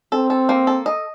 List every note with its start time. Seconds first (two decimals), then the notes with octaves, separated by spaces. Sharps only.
0.12 C4 A4
0.30 A4
0.49 A#3
0.67 A4
0.86 D#5